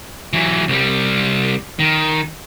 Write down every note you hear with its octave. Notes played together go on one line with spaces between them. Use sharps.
E3 F#3
C2 G3
D#3